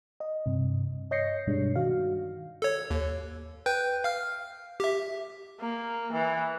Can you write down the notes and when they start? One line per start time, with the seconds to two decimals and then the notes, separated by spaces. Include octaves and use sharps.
0.20 D#5
0.46 G2 C3
1.11 C#5 D#5 G6 A#6 C7 C#7
1.47 G2 B2 G3 G#3 D4
1.76 D#3 F#4 F5
2.62 A4 C#5
2.90 D#2
3.66 B4 G5 G6
4.04 F5 F6
4.80 G4 E5
5.60 A#3
6.13 E3